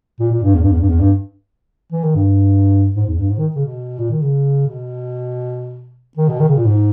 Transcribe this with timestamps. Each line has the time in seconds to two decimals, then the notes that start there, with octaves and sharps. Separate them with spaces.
0.20 A#2
0.31 A#2
0.43 G2
0.54 E2
0.63 G2
0.72 E2
0.80 G2
0.89 E2
1.00 G2
1.92 E3
2.03 D#3
2.15 G2
2.96 G#2
3.07 E2
3.19 G2
3.30 G#2
3.38 D#3
3.56 C#3
3.65 B2
3.99 A#2
4.11 D#3
4.22 C#3
4.68 B2
6.17 D#3
6.29 B2
6.40 D#3
6.49 C#3
6.57 A#2
6.66 G#2